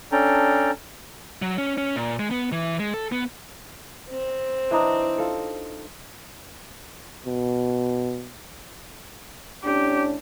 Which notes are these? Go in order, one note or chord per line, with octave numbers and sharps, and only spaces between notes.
C#4 D4 A4 G5 A#5
F#3
C#4
C#4
A#2
G#3
B3
E3
G#3
A4
B3
C4
E3 D4 D#4
F4 A4
B2
A2 C#4 D4 G4